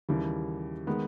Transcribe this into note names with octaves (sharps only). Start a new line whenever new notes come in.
D#2 C#3 E3 G3
D#3 G#3 B3